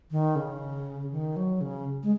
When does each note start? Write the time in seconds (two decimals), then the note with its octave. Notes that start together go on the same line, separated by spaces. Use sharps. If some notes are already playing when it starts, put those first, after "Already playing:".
0.11 D#3
0.36 C#3
1.11 D#3
1.36 F#3
1.61 C#3
2.03 G#3